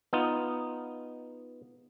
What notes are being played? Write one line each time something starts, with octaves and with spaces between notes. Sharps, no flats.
B3 D#4 F4